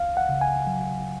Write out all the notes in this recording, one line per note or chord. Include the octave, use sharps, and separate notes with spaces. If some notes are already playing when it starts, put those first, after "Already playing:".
Already playing: C#2 F5
F#5
C#3
G#5
F#3